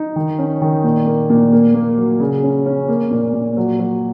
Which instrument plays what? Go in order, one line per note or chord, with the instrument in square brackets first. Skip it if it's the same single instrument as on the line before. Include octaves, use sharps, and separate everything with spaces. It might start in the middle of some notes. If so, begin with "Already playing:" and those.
Already playing: [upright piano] D#4
D#3
C#4
D#3
A#2
A#3
A#2
A#3
A#3
F#3
C#3
C#4
C#4
A#3
A#2
A#2
F#3
F#3